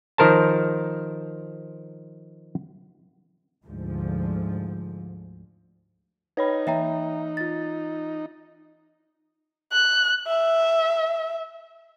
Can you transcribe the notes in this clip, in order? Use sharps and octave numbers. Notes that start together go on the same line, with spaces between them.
D#3 F3 A#4 C5 A5
D2 G#2 F3
D#4 B4 C#5 B5
E3 E5 G5 A#5
F4 A6
F#6
E5